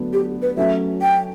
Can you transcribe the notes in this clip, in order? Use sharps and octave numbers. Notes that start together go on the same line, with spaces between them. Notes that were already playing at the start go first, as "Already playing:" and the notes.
Already playing: D2 D3 F#3 B3 D4
G4
B4
F#3 A3 C#4 E5
G5